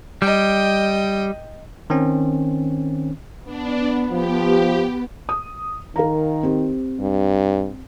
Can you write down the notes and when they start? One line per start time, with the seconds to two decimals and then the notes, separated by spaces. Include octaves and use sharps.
0.22 G3 D#5 G5
1.90 D#3 C4 C#4
3.44 B3 D4
4.11 F3 G4
5.29 D#6
5.96 D#3 A#4 F5 A#5
6.43 C4 G4
7.00 G2